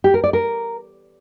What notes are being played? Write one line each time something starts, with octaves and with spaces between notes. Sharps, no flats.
G4
A#4
D5
A#4